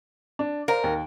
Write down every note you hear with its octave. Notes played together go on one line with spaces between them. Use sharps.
D4
A#4 C5 D5 F5
D#2